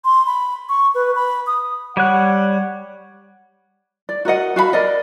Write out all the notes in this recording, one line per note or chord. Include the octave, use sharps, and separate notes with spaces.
C6
B5
C#6
B4
B5
D#6
G3 C#5 F#5 F#6
D5
F#4 A#4 D#5 F#5
F#4 F5 F#5 B5
A#4 D5 D#5